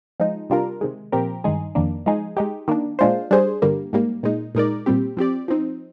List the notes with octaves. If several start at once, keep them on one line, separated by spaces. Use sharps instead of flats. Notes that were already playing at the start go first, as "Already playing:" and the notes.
F3 G#3 D#4
C3 G3 D4 F4 A#4
C3 D#3 G#3
A#2 F3 C4 G4 A#4
G2 D#3 G#3 D#4 G#4
F2 D#3 A#3 D4
F3 G#3 D#4 G#4
G#3 D#4 G4
D#3 A#3 D4
A#2 G#3 D4 F4 C5
G3 D4 G#4 C5
G2 D3 G3 A#3
G#2 G3 A#3
A#2 G#3 D#4
A#2 G#3 D#4 A#4 D5
A#2 G3 C4 G4
F3 C4 G4 D5
F3 C4 D#4